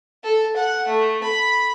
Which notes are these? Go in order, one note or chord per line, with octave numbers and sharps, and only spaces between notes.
A4
F#5
A3
B5